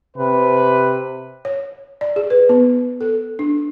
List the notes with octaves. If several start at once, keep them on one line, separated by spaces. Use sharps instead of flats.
C3 B4
C#5
D5
G#4
B4
B3
A4
D4